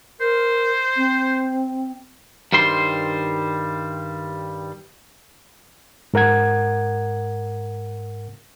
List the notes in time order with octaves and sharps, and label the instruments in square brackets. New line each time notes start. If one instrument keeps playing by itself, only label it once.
[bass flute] A#4 [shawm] C5
[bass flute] C4
[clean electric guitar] G2 D#3 G3 C5 C6
[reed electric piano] G#2 A#4 F#5 G#6